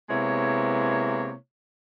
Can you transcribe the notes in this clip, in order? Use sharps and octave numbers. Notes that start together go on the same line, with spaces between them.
C3 G#3 A#3 B3 E4 C#5